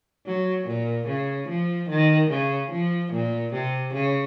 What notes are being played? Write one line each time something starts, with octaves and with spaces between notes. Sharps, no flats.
F#3
A#2
C#3
F3
D#3
C#3
F3
A#2
C3
C#3